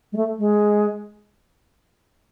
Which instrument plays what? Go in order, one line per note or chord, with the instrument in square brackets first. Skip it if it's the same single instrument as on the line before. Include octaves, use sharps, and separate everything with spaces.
[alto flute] G#3
A3
G#3